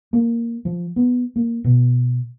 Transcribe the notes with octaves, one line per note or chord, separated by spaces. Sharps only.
A#3
F3
B3
A#3
B2